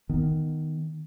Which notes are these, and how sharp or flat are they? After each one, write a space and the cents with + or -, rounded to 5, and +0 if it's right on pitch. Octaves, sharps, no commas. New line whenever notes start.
D#3 +0 B3 -5